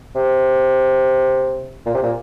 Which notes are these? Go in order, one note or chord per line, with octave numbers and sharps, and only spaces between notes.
C3
A#2
C3
A#2